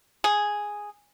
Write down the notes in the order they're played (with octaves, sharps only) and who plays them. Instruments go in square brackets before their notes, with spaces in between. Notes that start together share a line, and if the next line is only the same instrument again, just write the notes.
[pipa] G#4